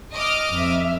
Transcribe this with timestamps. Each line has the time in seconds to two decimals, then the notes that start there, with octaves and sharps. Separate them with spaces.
0.13 D#5 D6 F6
0.51 F2 E5